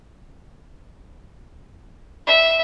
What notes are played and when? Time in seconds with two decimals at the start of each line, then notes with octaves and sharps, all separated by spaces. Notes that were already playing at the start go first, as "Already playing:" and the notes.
2.27 E5